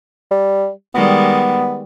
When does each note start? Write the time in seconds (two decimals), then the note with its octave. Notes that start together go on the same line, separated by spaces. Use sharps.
0.31 G3
0.95 D#3 G3 G#3 B3